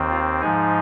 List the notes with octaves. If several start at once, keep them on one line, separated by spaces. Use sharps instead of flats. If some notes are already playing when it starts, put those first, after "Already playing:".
Already playing: D#2 D#3 C4
F4
G#2 F3 G#3 D#4 G#4